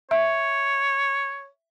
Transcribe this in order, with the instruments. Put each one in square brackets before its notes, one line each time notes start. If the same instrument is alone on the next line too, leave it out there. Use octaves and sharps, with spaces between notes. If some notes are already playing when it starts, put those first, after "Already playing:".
[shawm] C#5 [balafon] E5